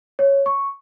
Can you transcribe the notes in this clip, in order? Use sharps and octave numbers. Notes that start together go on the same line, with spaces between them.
C#5
C#6